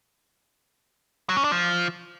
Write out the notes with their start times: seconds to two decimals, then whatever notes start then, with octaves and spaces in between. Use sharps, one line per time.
1.29 F#3
1.37 C#4
1.44 D4
1.52 F3